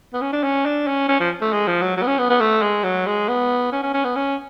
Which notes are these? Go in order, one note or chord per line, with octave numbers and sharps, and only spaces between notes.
B3
C#4
D4
C#4
D4
C#4
C#4
F3
A3
G#3
F3
F#3
F#3
B3
C#4
B3
B3
A3
G#3
F#3
G#3
B3
C#4
C#4
C#4
B3
C#4